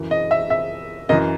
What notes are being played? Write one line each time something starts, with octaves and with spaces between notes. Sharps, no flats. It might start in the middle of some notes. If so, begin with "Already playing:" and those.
Already playing: F#2 E3
D#5
E5
E5
F#2 E3 D#5